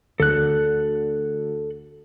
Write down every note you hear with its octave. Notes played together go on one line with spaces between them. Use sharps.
D2 A4 F#6